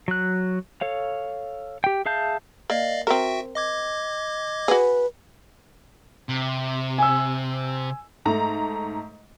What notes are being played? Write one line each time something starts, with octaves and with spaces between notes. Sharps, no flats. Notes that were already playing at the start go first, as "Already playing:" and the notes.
F#3 F#6
A4 C#5 F5
G4 G5
G#4 E5 F5 A5 G6
A#3 D5 D#5 F5
C4 F#4 A#4 E5 G5
D#5 D6 G#6
F#4 G#4 B4
C3
G#5 E6
G#2 A3 A#5